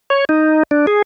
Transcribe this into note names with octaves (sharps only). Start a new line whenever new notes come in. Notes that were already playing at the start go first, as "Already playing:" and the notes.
C#5
D#4
D4
G#4